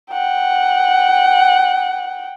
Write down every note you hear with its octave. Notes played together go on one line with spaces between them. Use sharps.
F#5 G5